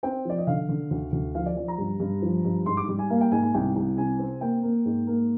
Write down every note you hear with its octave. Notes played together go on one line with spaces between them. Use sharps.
C4 G5
F3 D5
D#5
D3 F5
D3
D2
D2
F3 F5
D5
F3 D5
A#5
G2
G2
F3
G2
G#2 C6
D6
G3
G#5
A#3 F5
G5
G#2 G#5
G#5
C2 G5
C2
C3 G#5
C4
A#3 G5
A#3
G#2
A#3